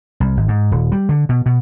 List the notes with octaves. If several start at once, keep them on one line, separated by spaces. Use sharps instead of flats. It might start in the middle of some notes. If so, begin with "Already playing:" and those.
C2
G#1
G#2
D#1
G3
D3
B2
B2